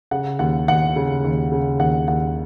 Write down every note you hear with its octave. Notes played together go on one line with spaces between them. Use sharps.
C#3 F#5
D#2 F#5
D#2 F#5
C#3
D#2
C#3
D#2 F#5
D#2 F#5